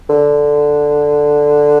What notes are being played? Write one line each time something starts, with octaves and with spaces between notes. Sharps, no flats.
D3